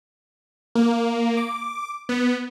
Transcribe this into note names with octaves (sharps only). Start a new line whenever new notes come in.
A#3
D6
B3